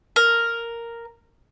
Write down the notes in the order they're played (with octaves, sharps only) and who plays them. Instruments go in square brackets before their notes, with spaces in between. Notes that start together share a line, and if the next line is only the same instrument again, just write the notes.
[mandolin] A#4